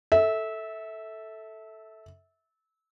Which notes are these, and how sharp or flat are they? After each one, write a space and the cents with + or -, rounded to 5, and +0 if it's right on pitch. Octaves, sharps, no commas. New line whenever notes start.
A4 +0 E5 -20